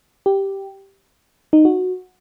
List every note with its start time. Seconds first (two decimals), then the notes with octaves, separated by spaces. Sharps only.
0.26 G4
1.53 D#4
1.65 F#4